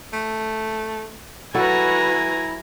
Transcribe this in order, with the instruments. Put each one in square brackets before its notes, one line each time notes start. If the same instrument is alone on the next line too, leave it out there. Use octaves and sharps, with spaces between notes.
[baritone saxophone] A3
[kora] F#3 A4 [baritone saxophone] E4 [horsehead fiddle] F#4 B4 [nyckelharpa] G#5 A#5